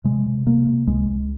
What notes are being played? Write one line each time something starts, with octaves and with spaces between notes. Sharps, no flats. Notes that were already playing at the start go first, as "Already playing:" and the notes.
C3 G#3
C3
C3 A#3
C3
C#2 G#3
C#2